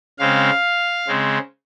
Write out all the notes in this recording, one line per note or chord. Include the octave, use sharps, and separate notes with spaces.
C#3 G#3 C4 F5
C#3 G#3 C4